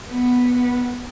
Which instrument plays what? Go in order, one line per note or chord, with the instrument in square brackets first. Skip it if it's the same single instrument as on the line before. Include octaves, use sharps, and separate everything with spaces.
[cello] B3